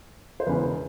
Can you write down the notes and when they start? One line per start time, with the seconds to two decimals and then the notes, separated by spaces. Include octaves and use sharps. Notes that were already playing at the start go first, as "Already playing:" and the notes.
0.40 C5
0.47 E1 E2 C#3 E3 B4